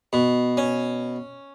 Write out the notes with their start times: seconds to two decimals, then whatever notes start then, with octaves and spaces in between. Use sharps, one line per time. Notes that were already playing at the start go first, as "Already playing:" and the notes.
0.13 B2
0.57 C#4